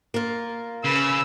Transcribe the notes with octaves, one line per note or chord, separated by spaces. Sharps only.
A#3 F4
C#3 C#4 B4 E6